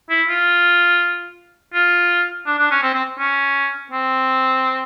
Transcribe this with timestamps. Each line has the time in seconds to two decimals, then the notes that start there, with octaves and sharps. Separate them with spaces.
0.10 E4
0.28 F4
1.74 F4
2.47 D4
2.58 D4
2.71 C#4
2.83 C4
2.95 C4
3.19 C#4
3.92 C4